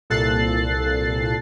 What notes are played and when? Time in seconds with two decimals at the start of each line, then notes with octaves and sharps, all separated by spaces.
0.10 C2 A#2 A4 F#6 A6 C7